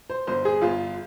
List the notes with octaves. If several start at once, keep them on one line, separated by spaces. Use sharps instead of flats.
C5
G1 C5
G#4
G1 F4